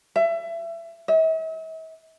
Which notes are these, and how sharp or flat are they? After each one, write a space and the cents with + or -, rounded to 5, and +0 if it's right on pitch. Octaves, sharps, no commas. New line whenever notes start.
E5 +25
E5 -45